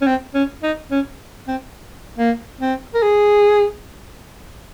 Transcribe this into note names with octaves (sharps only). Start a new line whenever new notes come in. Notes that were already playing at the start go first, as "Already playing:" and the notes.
C#4
C4
C#4
D#4
C#4
C4
A#3
C4
A#4
G#4